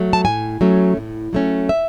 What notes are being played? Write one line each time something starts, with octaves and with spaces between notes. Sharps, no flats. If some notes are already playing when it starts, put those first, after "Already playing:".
Already playing: F#3 A3
A5
A2 G#5
F#3 A3 C#4
A2
F#3 A3 C#4
E5